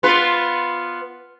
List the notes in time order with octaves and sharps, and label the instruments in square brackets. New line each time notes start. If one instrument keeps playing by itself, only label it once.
[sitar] B3 F4 B4